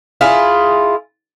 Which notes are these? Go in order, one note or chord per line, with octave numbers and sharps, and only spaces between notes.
E4 F4 G#4